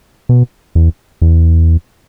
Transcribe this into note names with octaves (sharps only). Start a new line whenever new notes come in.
B2
E2
E2